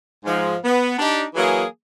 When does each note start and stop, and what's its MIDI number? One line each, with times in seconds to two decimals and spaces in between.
0.25 0.55 44
0.25 0.55 53
0.25 0.55 56
0.65 0.98 59
0.99 1.24 62
0.99 1.24 63
0.99 1.24 67
1.35 1.64 52
1.35 1.64 54
1.35 1.64 58
1.35 1.64 68